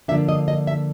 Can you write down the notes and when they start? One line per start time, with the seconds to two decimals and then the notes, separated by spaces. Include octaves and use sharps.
0.08 D3 F3 A#3 D4 E5
0.29 D#5
0.48 D#5
0.67 E5